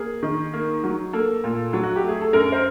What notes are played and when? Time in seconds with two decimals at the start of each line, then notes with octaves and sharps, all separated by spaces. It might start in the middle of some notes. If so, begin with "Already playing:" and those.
Already playing: A#3 G#4
0.23 D#3
0.53 A#3
0.84 F#3
1.13 A#3 A4
1.44 A#2
1.73 F#3
1.83 F#4
1.96 G4
2.03 A3 G#4
2.21 A4
2.33 F#2 A#4
2.52 C5